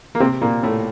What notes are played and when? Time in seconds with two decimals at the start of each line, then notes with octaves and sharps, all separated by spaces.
0.15 A#3
0.20 C3 C4
0.42 A#2 A#3
0.63 A2 A3